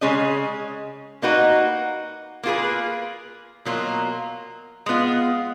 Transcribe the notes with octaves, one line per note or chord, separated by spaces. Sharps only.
C#3 G#3 C#4 G#4 D#5
A#3 D#4 F#4 B4
A#3 F4 G#4 B4
B2 F#3 A#3 F4
G#3 B3 F4